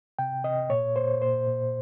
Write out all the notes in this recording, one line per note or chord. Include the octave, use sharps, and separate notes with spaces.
C3 G5
C3 D#5
A#2 C#5
A#2 C5
A#2 C5
A#2